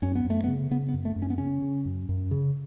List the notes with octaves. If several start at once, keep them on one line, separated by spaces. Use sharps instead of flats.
F#2 C#4
B3
F#2
A3
B3
C#3
C#3 B3
B3
F#2
A3
F#2
C#4
B3
C#3 C#4
C#3
F#2
F#2
C#3